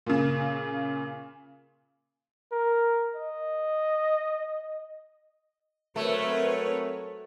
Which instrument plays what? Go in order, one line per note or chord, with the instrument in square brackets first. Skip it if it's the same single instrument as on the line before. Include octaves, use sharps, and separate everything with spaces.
[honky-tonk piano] A#2 C#3
[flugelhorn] A#4
D#5
[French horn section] F#3 F#4 A#4 [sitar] A3 [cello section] C4 B4 C#5